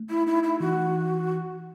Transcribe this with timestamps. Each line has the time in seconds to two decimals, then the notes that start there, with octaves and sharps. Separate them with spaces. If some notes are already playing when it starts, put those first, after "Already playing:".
Already playing: A3
0.09 E4
0.27 D#4 E4
0.43 E4
0.60 E3 F#4